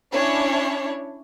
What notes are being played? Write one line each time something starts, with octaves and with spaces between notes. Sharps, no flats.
C#4 D4 E4 C#5